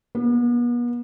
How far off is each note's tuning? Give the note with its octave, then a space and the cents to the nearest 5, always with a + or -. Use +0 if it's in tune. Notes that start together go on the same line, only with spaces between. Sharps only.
B3 -40